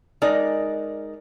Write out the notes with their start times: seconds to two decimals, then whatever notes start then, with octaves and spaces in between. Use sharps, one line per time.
0.22 G#3 D#4 A#4 D5